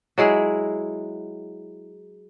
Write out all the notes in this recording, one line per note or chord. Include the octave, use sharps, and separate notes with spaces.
F#3 G#3 E4 G#4